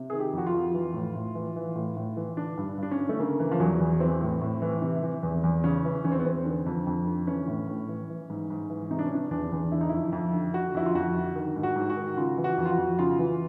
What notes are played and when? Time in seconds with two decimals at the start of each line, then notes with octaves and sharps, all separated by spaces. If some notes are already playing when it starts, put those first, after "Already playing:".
Already playing: C3
0.10 D#3 G#4
0.20 G4
0.33 F2 F#4
0.46 F4
0.54 F2
0.74 E3
0.94 A2
1.15 A2
1.35 E3
1.56 E3
1.76 A2
1.97 A2
2.17 E3
2.37 D3 D4
2.57 G2
2.77 G2
2.83 D4
2.91 C#4
2.98 D3
3.09 A3
3.19 C#3 A#3
3.40 E3
3.51 F3
3.59 E2 F#3
3.80 E2
4.00 E3 C4
4.21 A2
4.41 A2
4.62 E3
4.82 C3
5.03 E3
5.23 E2
5.44 E2
5.64 C#3 C#4
5.85 E3
6.05 E2 C#4
6.12 C4
6.19 B3
6.25 E2 C4
6.45 D3
6.66 F2
6.87 F2
7.07 D3
7.27 E3 C#4
7.48 A2
7.68 A2
7.89 E3
8.09 E3
8.30 G#2
8.50 G#2
8.70 E3
8.91 C3 D#4
8.99 D4
9.07 C#4
9.11 E3 D4
9.31 E2 D4
9.52 E2
9.72 D3 E4
9.81 D#4
9.89 F2 E4
10.12 F2
10.33 D3
10.53 D3 F#4
10.75 F2 E4
10.86 F4
10.95 F2 F#4
11.15 D3
11.36 D#3
11.56 G#2
11.63 F#4
11.76 G#2
11.90 F#4
11.97 D#3
12.17 C#3 F4
12.38 E3
12.44 F#4
12.58 F2
12.65 F4
12.71 F#4
12.78 F2
12.99 C#3 F4
13.19 E3